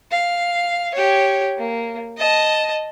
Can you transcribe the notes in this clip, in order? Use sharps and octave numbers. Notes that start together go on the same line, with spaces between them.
F5
G4 C#5
A#3
D#5 A5